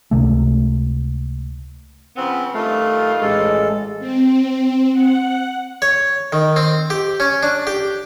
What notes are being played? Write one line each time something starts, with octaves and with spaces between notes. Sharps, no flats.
C#2 C3 A3
C#3 F3 B3 C4
G2 D#3 A3 F4
A1 G#3 A4
C4
F#5
C#5
D#3
C4
G4
C#4
D4
G4